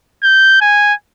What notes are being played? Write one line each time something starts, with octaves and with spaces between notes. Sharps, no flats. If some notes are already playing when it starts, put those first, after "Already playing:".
G6
G#5